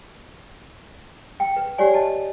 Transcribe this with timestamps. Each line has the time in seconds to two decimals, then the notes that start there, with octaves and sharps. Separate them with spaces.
1.40 G5
1.57 B4
1.78 G4 C#5 D5 G#5
1.94 D#5 A5